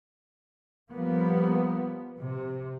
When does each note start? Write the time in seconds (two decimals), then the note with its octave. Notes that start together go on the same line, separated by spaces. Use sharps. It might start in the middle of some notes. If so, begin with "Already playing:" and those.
0.90 F3 G3 A#3 B3
2.20 C3